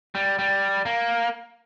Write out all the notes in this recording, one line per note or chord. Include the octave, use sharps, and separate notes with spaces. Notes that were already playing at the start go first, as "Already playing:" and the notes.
G3
G3
A#3